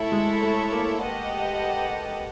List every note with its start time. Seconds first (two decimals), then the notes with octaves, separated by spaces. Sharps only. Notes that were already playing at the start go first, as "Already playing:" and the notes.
Already playing: A3 E4 A4 C#5 E5
0.12 G#3
0.42 A3
0.72 A#3
1.02 G4 B4 D#5 F#5 A5